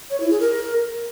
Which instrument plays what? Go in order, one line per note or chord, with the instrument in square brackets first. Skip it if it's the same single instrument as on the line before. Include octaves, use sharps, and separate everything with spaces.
[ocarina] C#5
E4
G#4
A#4